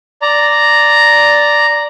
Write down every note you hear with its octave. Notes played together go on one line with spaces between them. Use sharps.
D5 A#5